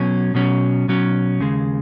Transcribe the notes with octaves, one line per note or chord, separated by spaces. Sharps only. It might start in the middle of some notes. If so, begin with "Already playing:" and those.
Already playing: B1 B2 F#3 C#4
B1 B2 F#3 C#4
B1 B2 F#3 C#4
D#2 C#3 G#3